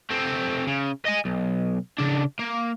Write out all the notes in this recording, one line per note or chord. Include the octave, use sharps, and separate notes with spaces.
A3 C4
C#3
D#5 G#5
B1
C#3 D4
A#3